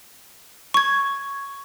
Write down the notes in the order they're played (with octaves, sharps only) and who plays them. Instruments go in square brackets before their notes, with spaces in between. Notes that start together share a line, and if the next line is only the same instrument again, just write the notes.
[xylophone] C#6 G#6